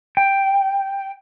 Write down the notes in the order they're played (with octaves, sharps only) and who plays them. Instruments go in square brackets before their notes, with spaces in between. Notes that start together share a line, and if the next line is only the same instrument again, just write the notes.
[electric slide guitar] G5